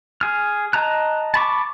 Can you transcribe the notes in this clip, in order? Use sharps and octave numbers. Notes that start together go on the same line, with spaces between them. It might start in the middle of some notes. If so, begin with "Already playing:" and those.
G#4 F6
D#5 A5 A#5 F#6
A5 B5 C#6 D6